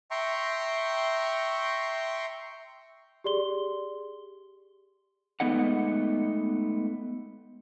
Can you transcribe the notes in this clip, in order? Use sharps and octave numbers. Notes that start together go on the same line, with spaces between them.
E5 G5 A#5 C6 C#6
G4 G#4 D5 C6 G7
G#3 A3 B3 D#4 D#5 F#5